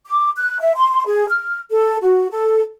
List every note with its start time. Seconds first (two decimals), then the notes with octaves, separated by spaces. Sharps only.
0.06 D6
0.37 F#6
0.60 E5
0.76 C6
1.07 G#4
1.29 F6
1.71 A4
2.02 F#4
2.31 A4